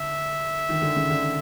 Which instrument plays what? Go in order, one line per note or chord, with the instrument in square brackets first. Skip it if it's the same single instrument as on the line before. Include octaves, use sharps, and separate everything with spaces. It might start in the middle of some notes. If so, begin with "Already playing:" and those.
Already playing: [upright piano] D3 [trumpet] E5
[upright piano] D#3
D3
C#3
D3